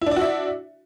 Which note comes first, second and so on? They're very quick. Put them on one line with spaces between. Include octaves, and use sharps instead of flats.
E4 D4 D5 F#4 E5